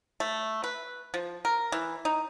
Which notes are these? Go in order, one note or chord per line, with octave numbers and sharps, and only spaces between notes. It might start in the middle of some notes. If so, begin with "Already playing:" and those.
A3
B4
F3
A#4
E3
D#4